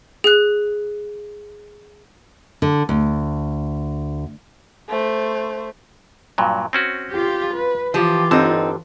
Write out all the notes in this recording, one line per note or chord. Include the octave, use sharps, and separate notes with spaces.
G#4 F#6
D3
D2
A3 C5
G2 A#2 F#3
C4 C#4 F#4
F4 G4
B4
E3 F3 F4 G4
G1 D3 C4 D#4